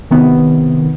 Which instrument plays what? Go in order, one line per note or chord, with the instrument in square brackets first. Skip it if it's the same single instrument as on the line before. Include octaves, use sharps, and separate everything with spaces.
[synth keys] C3 D#3 B3